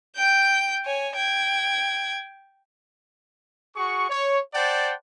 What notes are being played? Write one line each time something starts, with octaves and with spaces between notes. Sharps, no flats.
G5 G6
C#5 G#5
G5 G#6
F#4 G#4 C#6
C#5
C5 D5 F#5 G5 A5